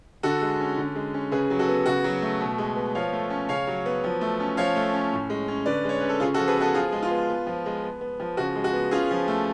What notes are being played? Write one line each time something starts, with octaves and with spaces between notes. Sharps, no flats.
D3 F#4 A4
G#3
C#4
D3
G#3
C#4
C#3 G#4 B4
F#3
F#4 A4
B3
C#3 F#4
F#3
A3
B2
G#3
B3
F3 C#5 F5
A3
C#4
C#3 C#5 F5
F#3
B3
F3
A3
C#4
F3 C#5 F5
A3
C#4
A2
G#3
C#4
D3 B4 D5
G#3 C#5
C#4 B4
A4
C#3 F4 G#4
F#4 A4
F3
G#4 B4
B3 F#4 A4
F3 F4 G#4
G#3
F4
B3
B3
F3
G#3
B3
B3
F3
C#3 F#4
G#3
F#4
B3
C#4 F4 G#4
F3
A3